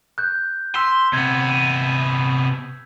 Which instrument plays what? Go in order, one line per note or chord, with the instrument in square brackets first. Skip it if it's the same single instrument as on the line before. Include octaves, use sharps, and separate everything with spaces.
[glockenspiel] F#6 G6
[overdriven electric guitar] C6 [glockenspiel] E6 B6 E7
[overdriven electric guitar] C3 B3 [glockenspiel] G#6 A6